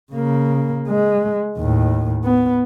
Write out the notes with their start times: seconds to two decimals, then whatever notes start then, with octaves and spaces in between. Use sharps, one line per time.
0.12 C#3 A#3
0.88 G#3
1.58 D#2 A2
2.24 B3